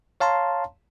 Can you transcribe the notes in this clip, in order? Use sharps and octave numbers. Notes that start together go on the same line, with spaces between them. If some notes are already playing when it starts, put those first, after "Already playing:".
C#5 F5 A5 A#5 C6